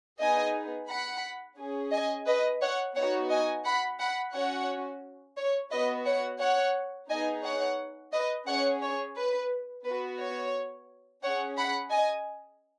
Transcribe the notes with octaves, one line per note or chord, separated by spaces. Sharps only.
B3 D#4 G#4 D#5 G#5
F#5 B5
C#4 G#4
D#5 G#5
B4 D#5
C#5 F#5
B3 D#4 F#4 C#5 F#5
D#5 G#5
F#5 B5
F#5 B5
C#4 F#4 C#5 F#5
C#5
B3 F#4 B4 D#5
C#5 F#5
C#5 F#5
B3 D#4 G#4 D#5 G#5
C#5 F#5
B4 D#5
C#4 G#4 C#5 F#5
C#5
B4
B3 F#4 B4
C#5
C#4 G#4 C#5 F#5
F#5 B5
D#5 G#5